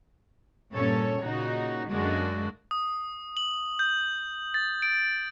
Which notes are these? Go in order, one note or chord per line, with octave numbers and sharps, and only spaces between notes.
G2 A#2 C#4 A4 C#5
A#2 C#3 D#4 F#4
F#2 D3 G#3 A#3 D4 F#4
D#6
F#7
G6
A6
D7